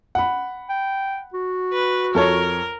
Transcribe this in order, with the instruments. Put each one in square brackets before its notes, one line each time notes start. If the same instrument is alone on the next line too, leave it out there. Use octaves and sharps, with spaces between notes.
[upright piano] F#5 B5
[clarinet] G5
F#4
[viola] B4
[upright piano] F2 A4 C#5 [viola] A#4